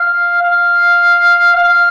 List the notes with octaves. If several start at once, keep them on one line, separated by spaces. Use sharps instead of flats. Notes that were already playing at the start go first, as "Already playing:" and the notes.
Already playing: F5
F5
F5